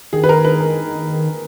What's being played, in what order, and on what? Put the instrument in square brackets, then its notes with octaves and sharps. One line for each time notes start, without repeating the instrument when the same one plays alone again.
[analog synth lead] D#3 [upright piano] G#4
[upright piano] B4
A#4
B4
A#4